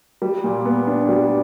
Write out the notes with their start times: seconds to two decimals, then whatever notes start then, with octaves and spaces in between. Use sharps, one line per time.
0.22 G3
0.44 A#2
0.65 B3
0.87 D4
1.09 G3